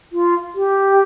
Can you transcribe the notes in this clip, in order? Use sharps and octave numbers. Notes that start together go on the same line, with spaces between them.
F4
G4